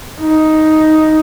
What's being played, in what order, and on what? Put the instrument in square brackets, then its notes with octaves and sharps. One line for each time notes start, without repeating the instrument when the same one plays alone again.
[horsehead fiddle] D#4